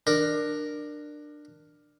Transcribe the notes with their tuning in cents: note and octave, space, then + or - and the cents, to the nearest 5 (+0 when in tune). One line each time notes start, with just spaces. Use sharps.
D4 +20 A#4 +0